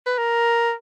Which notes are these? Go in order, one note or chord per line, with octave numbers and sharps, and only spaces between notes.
B4
A#4